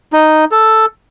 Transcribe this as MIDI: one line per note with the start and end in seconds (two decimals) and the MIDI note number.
0.13 0.45 63
0.52 0.86 69